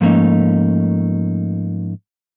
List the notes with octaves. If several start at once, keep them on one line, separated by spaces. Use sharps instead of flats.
G#2 F3 A3 A#3 C#4 D#4